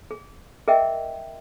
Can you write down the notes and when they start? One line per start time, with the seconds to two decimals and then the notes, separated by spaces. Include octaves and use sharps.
0.11 G#4
0.68 G#4 A#4 D#5 E5 G5